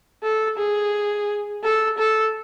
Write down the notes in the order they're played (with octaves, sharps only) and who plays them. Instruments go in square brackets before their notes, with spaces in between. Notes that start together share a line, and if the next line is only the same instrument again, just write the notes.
[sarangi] A4
G#4
A4
A4